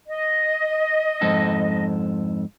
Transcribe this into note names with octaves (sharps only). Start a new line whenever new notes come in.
D#5
F2 G#2 A4